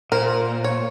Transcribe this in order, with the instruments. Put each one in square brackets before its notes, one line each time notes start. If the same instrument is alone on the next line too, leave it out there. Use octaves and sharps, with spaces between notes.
[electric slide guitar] A#2 [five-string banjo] A#4 [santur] C5
[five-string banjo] C#5